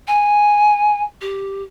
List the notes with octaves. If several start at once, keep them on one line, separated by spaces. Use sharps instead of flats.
G#5
G4